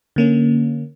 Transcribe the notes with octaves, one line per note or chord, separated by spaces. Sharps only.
D3 A#3 C#4